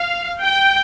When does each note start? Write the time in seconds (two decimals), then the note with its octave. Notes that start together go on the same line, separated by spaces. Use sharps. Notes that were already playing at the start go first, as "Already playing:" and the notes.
Already playing: F5
0.43 G5